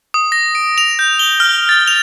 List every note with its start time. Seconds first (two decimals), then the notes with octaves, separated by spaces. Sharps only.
0.14 D#6
0.32 A#6
0.55 D7
0.78 F7
0.99 G6
1.19 G7
1.40 F6
1.69 A6
1.87 F7